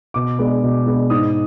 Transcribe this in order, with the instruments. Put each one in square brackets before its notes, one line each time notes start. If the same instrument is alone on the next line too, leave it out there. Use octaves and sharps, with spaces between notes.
[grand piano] B2 D6
G#3 B3 D4
B2
G#3 B3 D4
G#2 D#6